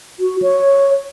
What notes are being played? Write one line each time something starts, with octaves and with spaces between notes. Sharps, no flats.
F#4
C#5